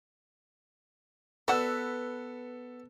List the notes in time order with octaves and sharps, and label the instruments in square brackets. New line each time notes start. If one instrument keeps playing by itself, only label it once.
[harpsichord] B3 [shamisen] F#4 D5 F#5 [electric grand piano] A4 [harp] B4 E6 F#6